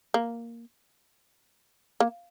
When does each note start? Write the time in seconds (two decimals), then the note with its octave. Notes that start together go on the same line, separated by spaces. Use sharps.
0.14 A#3
2.00 A#3